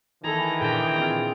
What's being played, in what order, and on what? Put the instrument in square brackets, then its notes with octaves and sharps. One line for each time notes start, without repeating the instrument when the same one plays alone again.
[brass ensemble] D#3 E3 [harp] G#4 [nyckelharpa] A4 A#5
[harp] A#2 D4 [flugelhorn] G#4 [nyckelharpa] G5 A#5
[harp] C4 F4